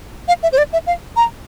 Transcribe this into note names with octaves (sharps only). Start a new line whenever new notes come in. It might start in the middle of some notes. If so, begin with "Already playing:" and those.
F5
E5
C5
D5
E5
F5
A#5